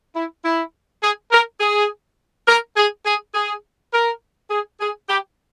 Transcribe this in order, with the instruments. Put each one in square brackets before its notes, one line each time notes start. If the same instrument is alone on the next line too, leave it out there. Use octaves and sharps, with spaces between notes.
[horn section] E4
E4
G#4
A#4
G#4
A#4
G#4
G#4
G#4
A#4
G#4
G#4
G4